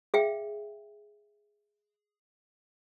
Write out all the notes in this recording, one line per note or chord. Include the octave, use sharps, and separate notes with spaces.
G#4 E5 F5 G5